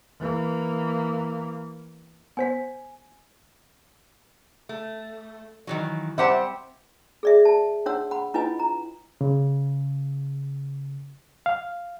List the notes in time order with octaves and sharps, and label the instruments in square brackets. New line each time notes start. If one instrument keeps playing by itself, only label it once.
[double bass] E3 A#3
[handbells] B3 C5 B6 [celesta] G#5
[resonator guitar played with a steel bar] A3
D#3 E3 F#3
[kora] G3 C4 G4 [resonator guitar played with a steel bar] E5 F#5 A5
[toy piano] G#4 D5 E5
A5
D4 F#4 C#5 F#5 E6
F#5 B5
D4 E4 F4 B4 D#5 G#5
A#5
[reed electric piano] C#3
F5